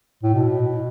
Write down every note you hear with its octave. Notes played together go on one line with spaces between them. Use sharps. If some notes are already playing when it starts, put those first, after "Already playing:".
A2
B2